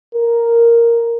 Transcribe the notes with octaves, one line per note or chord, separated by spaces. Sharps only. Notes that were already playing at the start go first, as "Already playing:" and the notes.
A#4